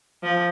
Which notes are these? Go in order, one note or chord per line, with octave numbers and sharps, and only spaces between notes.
F3